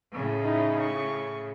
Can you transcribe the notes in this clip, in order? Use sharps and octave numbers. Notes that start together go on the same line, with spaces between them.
A2 C#3
D#4 E4
C#6